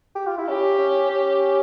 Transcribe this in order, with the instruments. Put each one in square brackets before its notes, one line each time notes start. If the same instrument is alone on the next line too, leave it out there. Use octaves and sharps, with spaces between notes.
[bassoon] G4
F4
E4
[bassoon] C#4 [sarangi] G4
[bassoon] C#4
C#4